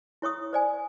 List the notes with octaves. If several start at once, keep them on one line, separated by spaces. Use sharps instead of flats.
E4 C#5 C#6 D#6
C5 D5 G#5